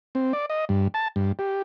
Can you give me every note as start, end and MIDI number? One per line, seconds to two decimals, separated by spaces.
0.15 0.33 60
0.33 0.46 74
0.50 0.65 75
0.69 0.88 43
0.94 1.08 81
1.16 1.32 43
1.39 1.62 67